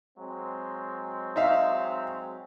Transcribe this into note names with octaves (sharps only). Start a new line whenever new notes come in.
F#3 G#3 C4
D#4 E5 F5